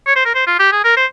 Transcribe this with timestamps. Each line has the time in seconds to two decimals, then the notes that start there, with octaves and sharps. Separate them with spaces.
0.07 C#5
0.16 C5
0.25 A#4
0.35 C5
0.47 F4
0.59 G4
0.72 G#4
0.84 A#4
0.97 C5